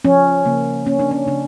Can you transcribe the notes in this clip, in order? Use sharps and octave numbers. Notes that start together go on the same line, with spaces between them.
F3 C#4
C#3 A#3
A#3 C#4
D4
C#4
C#3 D4